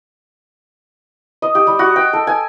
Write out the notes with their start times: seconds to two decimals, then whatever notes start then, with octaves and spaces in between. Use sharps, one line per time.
1.42 D#5
1.55 G4
1.67 G3
1.79 F#4
1.96 G5
2.13 A4
2.27 G#5